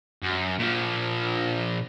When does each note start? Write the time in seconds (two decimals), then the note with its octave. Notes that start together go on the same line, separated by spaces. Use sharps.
0.23 F#2
0.59 A#2 F3